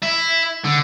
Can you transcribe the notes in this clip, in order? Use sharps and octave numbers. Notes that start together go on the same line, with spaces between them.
E4
D3